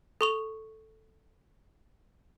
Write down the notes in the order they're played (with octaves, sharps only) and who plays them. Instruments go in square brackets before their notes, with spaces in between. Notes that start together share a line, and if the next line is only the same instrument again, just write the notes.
[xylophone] A4 C#6 F7